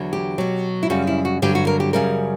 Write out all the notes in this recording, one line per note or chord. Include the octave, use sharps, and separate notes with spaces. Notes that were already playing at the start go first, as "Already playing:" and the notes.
Already playing: E2 D3 F#3
G4
B2 F#3
E4
F#2 C#3 G3 F#4
E4
F#4
G2 D3 F#3 G4
F#4
A#4
G4
F#2 C#3 G3 A#4